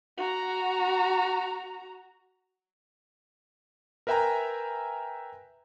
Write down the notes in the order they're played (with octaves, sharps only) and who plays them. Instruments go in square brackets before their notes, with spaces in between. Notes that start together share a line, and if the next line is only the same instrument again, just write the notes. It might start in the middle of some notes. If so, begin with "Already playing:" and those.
[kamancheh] F#4 A#5
[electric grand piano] A#4 B4 E5 G5 G#5 A#5